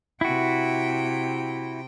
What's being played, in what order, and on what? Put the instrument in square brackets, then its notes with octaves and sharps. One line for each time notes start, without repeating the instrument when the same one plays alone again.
[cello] C3 G5 [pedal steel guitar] E4 F#4